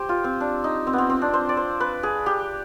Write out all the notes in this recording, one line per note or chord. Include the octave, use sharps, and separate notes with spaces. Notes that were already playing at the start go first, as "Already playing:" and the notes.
Already playing: G4 C5
F4
C4
D4
D#4
C4
B3
C4
C4
D4
C5
D5
C5
B4
G#4
G4